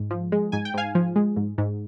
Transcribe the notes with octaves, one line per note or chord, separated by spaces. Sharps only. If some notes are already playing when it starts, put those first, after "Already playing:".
Already playing: G#2
F3
G#3
G#2 G#5
G5
G#2 F5 G#5
F3
G#3
G#2
G#2